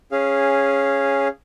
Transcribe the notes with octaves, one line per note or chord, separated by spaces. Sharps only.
C#4 G#4 F5